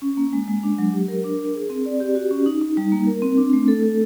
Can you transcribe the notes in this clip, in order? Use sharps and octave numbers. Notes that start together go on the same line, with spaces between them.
C#4
A#3
G#3
G#3
D4
F#3
G4
A#4
D4
A#4
G#4
C4
D5
G4
F#4
C#4
D#4
D#4
G3
A#3
A#4
C4
D4
A3
A4
A4